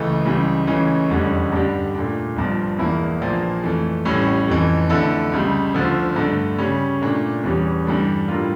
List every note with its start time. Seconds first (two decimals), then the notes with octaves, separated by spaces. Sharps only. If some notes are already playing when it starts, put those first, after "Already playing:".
Already playing: C#2 C#3 E3 A3
0.25 C#2 C#3 E3 G3
0.67 C#2 C#3 E3 A3 C#4
1.09 F1 E2 D3 G3 C#4
1.52 G2 D3 G3 D4 G4
1.95 A#2 A3 D4
2.36 G1 G2 F3
2.78 E1 E2 E3 A#3 E4
3.21 A#1 A#2 F3 A#3
3.63 F2 E3 A3
4.05 A1 A2 G3 C#4
4.48 F1 F2 E3
4.89 F2 D3 A3 E4 A4
5.32 C#2 C#3 G3
5.74 D2 D3 F3
6.16 G2 D3 A3
6.58 C#3 G3 C#4
7.01 A#2 A3 D4
7.44 E2 E3 G3 C#4 G4
7.85 G2 E3 G3 D4 A4
8.28 A2 G3 D4 F4 A#4